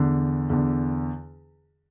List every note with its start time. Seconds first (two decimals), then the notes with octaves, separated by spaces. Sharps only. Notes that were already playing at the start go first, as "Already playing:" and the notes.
Already playing: E2 D3
0.50 E2 D3